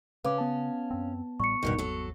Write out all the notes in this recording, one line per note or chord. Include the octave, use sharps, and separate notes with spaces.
C#3 C#4 B4 F5 D6
B3 A5
F#2 C4
A1 A2 G3 C#6 C#7
G#1 E2 G2 B2 D#3
F#3 A4